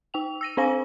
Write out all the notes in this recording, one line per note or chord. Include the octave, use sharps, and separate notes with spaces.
D#4 G5 F7
E6 A#6 D#7
C4 D4 C5 F5 G#5 A#6